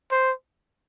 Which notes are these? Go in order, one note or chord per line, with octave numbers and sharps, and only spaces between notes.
C5